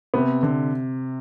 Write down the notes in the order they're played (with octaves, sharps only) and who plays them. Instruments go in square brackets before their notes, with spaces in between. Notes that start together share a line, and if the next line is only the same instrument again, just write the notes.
[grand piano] C3 [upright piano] B3
[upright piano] D3